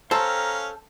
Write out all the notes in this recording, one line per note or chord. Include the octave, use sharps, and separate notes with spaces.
C#4 A4 C5 F5 G5 A5 A#5